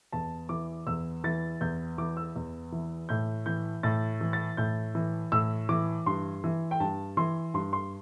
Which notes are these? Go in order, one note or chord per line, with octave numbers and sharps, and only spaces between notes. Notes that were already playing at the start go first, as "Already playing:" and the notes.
E2 A5
E3 D6
E2 E6
E3 A6
E2 G6
E3 D6
E6
E2
E3
A2 G6
E3 G6
A2 A6
E3
A6
A2 G6
E3
A2 E6
E3 D6
G2 C6
E3
G5
G2 A5
E3 C6
G2 C6
C6